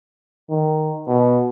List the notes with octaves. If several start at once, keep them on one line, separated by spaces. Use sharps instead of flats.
D#3
B2